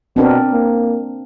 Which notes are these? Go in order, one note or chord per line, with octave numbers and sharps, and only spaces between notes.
B2 C4 D4 A#4
A#3